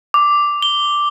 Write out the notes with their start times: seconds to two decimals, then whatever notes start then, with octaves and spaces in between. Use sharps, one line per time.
0.14 D6
0.62 G7